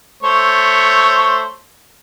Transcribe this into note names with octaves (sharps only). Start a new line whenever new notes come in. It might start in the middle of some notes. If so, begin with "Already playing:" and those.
A3 C5 C#5